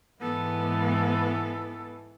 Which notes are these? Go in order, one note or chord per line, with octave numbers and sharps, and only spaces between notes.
G#2 E3 B3 A4